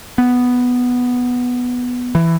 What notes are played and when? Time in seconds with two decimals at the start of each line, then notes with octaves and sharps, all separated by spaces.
0.18 B3
2.15 E3